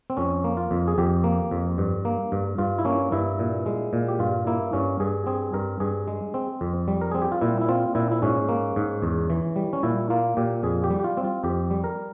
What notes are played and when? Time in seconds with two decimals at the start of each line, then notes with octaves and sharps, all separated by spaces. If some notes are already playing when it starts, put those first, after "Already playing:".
0.10 C4
0.17 F2 C#4
0.44 A#3
0.57 F4
0.71 F2
0.87 G#4
0.98 F2 G4
1.24 A#3
1.51 F2
1.78 G2
2.05 A#3
2.32 G2
2.58 G2 F4
2.79 E4
2.85 A#3 C#4
3.12 G2 E4
3.39 A#2
3.66 G#3
3.93 A#2
4.08 G4
4.19 G2 F4
4.47 A#3 E4
4.73 G2 C#4
5.00 G2 G#4
5.26 C4 G#4
5.53 G2 A#4
5.80 G2 G#4
6.08 G#3
6.34 C4
6.61 F2
6.88 G3
7.01 A#4
7.11 C4 G#4
7.22 G4
7.32 F4
7.41 A#2 E4
7.61 E4
7.69 C4 F4
7.95 A#2 E4
8.11 E4
8.22 G#2 C#4
8.49 A#3
8.76 G#2
9.02 E2
9.30 E3
9.56 G3
9.73 C#4
9.83 A#2 E4
10.10 A#3 F4
10.37 A#2 G4
10.63 F2 G#4
10.84 G4
10.90 G3
11.00 G4
11.04 F4
11.17 C4
11.24 F4
11.44 F2 G4
11.71 G3
11.84 A#4